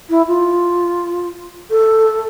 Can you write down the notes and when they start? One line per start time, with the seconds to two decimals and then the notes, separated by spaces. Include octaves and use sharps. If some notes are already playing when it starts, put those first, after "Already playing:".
0.10 E4
0.28 F4
1.70 A4